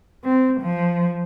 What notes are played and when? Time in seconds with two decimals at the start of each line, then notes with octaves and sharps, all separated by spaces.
0.24 C4
0.61 F3